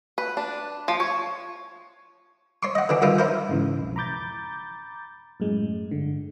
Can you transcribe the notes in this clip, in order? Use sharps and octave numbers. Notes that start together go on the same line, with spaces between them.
B4
D4
F3
C#5
C#5 C6 C#6
D#5 F#5
D3 E3 D4
G2 D3 D#3 E4 F4
E4 A#4 C5
G#2 C#3 E3
B1 F2
A#5 B5 D6 G6 A6
F#2 A2 G#3
G1 D3